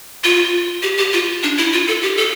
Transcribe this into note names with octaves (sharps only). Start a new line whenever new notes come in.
F4
G4
G4
F4
D4
E4
F4
A4
G4
A4